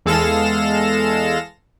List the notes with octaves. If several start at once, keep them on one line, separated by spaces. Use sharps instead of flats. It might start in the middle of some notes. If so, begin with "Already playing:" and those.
E2 G#3 A4 F5 A#6 E7